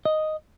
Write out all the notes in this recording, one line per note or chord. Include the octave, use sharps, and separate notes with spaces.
D#5